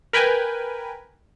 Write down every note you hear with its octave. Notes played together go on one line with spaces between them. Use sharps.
A#4 B4 G5 G#5